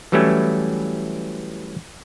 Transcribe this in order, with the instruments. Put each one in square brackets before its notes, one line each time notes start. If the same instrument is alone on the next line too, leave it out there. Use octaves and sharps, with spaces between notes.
[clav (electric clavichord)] E3 F#3 G3 A3 C#4 E4